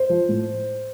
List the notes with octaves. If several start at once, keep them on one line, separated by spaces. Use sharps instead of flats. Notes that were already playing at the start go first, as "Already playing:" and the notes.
Already playing: C5
F3
A2